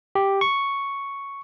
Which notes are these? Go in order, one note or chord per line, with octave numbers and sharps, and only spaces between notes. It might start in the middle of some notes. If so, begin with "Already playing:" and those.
G4
C#6